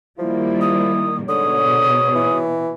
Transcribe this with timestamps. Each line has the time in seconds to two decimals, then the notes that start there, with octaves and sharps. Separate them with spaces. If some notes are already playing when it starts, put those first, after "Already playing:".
0.19 D#3 F3 G3 A#3 E4
0.61 D#6
1.29 G#2 B2 D3 C#5 D#6
2.15 E3